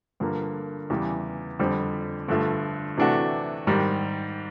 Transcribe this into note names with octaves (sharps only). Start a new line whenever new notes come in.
G2 D3 F3 A#3
E2 C#3 E3 G3
F2 D3 G3 C4
G2 D3 F3 A3
C3 E3 A3 D4 F#4
G#2 D#3 G3